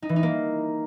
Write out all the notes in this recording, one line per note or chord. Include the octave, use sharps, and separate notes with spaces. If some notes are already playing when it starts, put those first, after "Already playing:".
D#4
E3
D#4
A#3